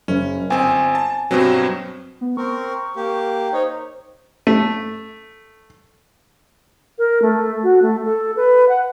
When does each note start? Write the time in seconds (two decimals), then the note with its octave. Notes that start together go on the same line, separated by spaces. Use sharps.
0.08 F#1 C#4
0.50 G1 C4 G#5
0.95 A5
1.31 G2 B2 F#3 C4
2.21 B3
2.37 C4 A#4 C#6
2.96 A#3 G4
3.53 D#4 C5 C#5
4.47 A3
6.98 A#4
7.22 A3
7.63 F#4
7.82 A3
8.05 A4
8.36 B4
8.69 F#5